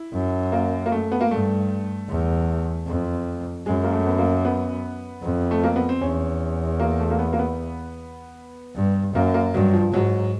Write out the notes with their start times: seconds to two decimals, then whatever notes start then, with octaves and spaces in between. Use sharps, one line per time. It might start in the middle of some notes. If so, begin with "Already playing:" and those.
Already playing: E4
0.13 F#2
0.52 A#3
0.86 A#3
0.92 A3
1.12 B3
1.21 A#3
1.30 G2 A3
2.09 E2
2.87 F2
3.66 F#2 G#3
3.84 A#3
3.92 A3
4.07 B3
4.18 A#3
4.45 B3
5.22 F2
5.51 A3
5.64 A#3
5.76 B3
5.89 C4
6.01 E2 C#4
6.80 A#3
6.99 A3
7.11 A#3
7.19 B3
7.33 A#3
7.39 B3
8.76 G2
9.15 F#2 A#3
9.34 A#3
9.54 G2 F#3
9.73 F3
9.93 G#2 F#3